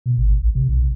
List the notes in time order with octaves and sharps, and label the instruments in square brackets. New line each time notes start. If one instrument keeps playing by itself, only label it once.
[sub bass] B2
G#1
A#1
C3
B1